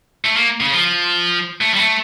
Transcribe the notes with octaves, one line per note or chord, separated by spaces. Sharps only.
A3
A#3
C#3
F3
A3
G3
A3